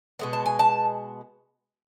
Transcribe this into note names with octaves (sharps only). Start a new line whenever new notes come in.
B2 G#3 B3
A5
G#5
A5